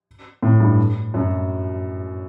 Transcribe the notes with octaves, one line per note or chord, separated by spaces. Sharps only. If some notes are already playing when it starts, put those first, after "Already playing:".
A2
G2
F#2